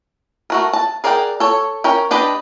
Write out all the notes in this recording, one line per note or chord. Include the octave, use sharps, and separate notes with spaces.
A3 F#4 A#4
A5
G#4 A#4 D5 F#5 G5
A4 C#5
C#4 A#4 G5
D4 G4 B4 D5 D#5